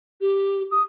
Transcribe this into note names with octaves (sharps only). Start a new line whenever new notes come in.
G4
D#6